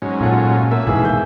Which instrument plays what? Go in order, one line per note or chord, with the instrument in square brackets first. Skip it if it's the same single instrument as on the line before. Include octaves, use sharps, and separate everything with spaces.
[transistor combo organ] G#2 F#3 C#4
[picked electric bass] A#2 [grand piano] F4 A4 F#5
[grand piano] A#3 [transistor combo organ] E5
[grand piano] D#2 E3 G#4 [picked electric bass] G#2 B2
[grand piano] G6